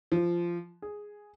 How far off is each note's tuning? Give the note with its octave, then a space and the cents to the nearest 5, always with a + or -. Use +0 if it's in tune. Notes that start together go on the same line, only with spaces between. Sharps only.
F3 -15
G#4 +0